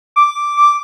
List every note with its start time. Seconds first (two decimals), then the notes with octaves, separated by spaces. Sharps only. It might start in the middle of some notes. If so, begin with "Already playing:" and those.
0.16 D6
0.57 D6